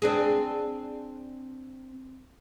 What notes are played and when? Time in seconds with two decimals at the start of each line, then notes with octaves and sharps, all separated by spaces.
0.02 C4 D4 G#4